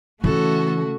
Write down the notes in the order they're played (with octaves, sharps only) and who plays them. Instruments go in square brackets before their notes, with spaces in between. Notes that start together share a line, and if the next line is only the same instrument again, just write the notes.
[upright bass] C#3 [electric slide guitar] E3 C#4 [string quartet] A3 F#4 [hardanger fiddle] A4